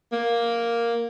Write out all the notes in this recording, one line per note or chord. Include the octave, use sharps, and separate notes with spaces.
A#3